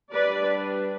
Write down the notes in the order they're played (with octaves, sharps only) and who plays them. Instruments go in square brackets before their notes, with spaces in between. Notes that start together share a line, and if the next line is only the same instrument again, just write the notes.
[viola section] G3 D4 B4 D5